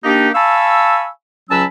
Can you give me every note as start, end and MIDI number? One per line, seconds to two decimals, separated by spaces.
0.04 0.29 58
0.04 0.29 62
0.04 0.29 63
0.04 0.29 67
0.35 1.07 77
0.35 1.07 80
0.35 1.07 81
0.35 1.07 83
0.35 1.07 85
0.35 1.07 88
1.50 1.64 37
1.50 1.64 54
1.50 1.64 61
1.50 1.64 81
1.50 1.64 83
1.50 1.64 88